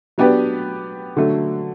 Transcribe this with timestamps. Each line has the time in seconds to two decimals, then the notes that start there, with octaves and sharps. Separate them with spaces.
0.18 F#3 B3 D4 G4 B4
1.17 D3 F#3 A3